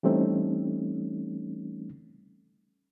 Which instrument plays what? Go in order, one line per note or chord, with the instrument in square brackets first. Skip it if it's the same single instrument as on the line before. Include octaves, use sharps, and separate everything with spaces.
[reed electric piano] E3 G3 A3 C4 C#4 D#4